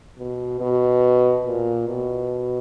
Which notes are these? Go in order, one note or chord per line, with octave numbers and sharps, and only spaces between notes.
B2
B2
A#2
B2